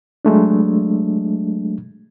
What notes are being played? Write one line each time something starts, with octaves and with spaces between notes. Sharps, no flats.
F#3 G#3 A3 D4